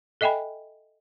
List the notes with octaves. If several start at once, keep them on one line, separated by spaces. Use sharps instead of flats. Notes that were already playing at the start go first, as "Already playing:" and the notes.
A4 D#5 E5 G5 G#5 B5